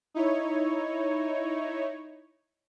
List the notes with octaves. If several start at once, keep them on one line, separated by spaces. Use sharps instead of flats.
D#4 E4 C#5